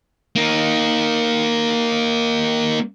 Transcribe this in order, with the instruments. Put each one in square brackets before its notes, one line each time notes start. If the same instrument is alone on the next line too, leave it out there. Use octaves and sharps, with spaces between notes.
[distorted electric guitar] A#3 D#4